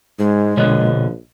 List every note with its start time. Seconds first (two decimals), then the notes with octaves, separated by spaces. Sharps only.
0.19 G#2 G#3
0.57 A#1 B2 D3 F3 C#5 D#5 F#6